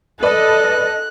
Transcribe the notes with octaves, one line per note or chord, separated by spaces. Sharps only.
A4 B4 D5 D#5 F#6